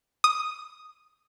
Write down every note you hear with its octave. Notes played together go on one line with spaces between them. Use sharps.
D#6